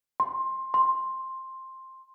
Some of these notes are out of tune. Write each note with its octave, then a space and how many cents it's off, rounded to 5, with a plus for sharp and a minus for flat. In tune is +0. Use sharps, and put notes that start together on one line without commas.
C6 +20
C6 +10